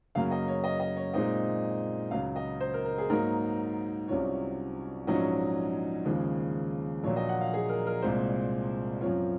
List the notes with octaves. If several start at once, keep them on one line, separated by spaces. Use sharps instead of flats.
F#2 C#3 F#3 A#3 F5
D#5
C#5
D#5
D#5
C#5
A#2 G#3 C4 D#4 D#5
C#2 C#3 F#3 F5
D#5
C5
A#4
A#4
G#4
G#2 F#3 A#3 D#4 A#4
C2 C3 F#3 C#4 F4 C#5
A#1 G#2 F#3 C#4 F4 D#5
D#2 C#3 F3 G#3
A#1 A#2 F#3 C#5
D#5
F#5
F5
G#4
A#4
A#4
C2 A#2 G#3 C4 C5
F#2 F3 C4 F4 C#5